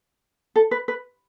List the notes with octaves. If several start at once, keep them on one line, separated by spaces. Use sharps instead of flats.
A4
B4
B4